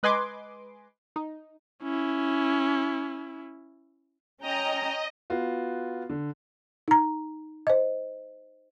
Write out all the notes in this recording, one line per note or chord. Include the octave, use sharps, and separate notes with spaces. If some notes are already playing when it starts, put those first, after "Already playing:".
G#3 B4 D#5 G#5 C6 D6
D#4
C#4 E4
C#4 D#5 G5 A#5
B3 F4 F#4
D3
D#4 A#5
C5 D#5